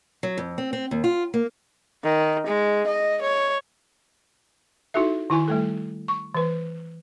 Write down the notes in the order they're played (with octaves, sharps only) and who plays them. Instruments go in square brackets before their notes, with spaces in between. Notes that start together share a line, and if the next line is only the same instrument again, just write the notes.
[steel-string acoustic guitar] F#3
F2
C4
C4
D#2
F4
A#3
[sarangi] D#3
G#3
D#5
C#5
[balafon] D#4 E4 F#4 A4 E5
D#3 E4 G#5 C6
G3 A3 A4
C#6
E3 B4